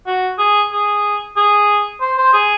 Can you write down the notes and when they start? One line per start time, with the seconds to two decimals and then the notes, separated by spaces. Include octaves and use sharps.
0.07 F#4
0.39 G#4
0.72 G#4
1.37 G#4
2.01 C5
2.18 C5
2.33 G#4